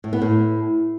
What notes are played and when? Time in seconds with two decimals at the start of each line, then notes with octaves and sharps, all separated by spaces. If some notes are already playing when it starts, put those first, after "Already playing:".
0.04 A2
0.13 B3
0.22 A2